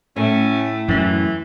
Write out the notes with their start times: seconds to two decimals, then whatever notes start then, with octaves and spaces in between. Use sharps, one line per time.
0.16 A2 A3 C#4
0.88 F#2 E3 F#3